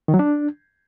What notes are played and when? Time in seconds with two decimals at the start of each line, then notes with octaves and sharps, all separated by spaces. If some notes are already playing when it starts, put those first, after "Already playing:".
0.08 D#3
0.14 F#3
0.19 D4